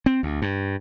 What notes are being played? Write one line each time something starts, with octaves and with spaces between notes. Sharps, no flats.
C4
D2
G2